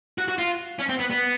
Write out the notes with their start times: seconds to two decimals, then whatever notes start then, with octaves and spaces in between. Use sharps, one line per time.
0.18 F#4
0.28 F#4
0.38 F4
0.79 C#4
0.89 C4
0.99 B3
1.11 B3